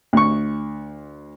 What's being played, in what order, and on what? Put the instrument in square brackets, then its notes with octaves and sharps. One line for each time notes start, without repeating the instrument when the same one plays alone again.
[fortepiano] D2 C#6